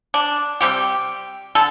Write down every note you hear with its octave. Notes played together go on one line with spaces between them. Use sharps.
D4
C3 G3 G4
D3 A4